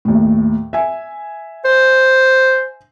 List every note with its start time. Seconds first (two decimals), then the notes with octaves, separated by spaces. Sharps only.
0.05 D#2 A2
0.73 E5 G#5
1.65 C5